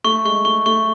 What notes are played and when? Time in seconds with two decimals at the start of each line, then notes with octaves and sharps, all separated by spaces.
0.04 A3 C#6
0.25 G#3 C#6
0.45 A3 C#6
0.66 A3 C#6